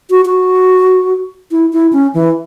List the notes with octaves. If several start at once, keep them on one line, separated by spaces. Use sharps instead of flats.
F#4
F#4
E4
E4
C#4
E3